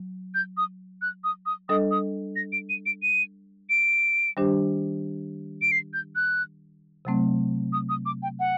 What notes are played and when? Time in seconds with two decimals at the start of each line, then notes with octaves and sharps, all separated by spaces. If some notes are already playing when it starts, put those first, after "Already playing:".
Already playing: F#3
0.35 G6
0.57 D#6
1.02 F#6
1.24 D#6
1.46 D#6
1.69 G3 D4 A4 D#5 D#6
1.91 D#6
2.36 A#6
2.52 D7
2.69 D#7
2.86 D7
3.03 D#7
3.70 D7
4.37 D#3 G3 D4 G4 C5
5.62 D7
5.72 C7
5.94 G6
6.16 F#6
7.05 C3 F#3 A3 C4
7.73 D#6
7.89 D#6
8.06 D6
8.23 G5
8.40 F#5